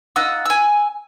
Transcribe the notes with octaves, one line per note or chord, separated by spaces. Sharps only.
D#4 F4 F#5 E6
G#5 E6